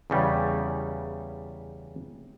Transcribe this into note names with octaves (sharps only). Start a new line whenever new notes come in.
E2 C#3 G3